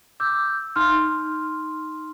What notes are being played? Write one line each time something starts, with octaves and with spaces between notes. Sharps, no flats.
D6 E6 G6
D#4 C6 F6